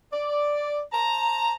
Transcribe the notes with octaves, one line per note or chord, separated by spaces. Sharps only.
D5
C5 A5 A#5